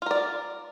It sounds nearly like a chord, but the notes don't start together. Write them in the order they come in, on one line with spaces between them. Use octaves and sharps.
F4 A#4 D5